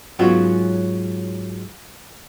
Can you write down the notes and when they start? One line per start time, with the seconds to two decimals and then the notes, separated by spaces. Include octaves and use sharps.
0.19 G#2 F#3 B3 C#4 F4 F#4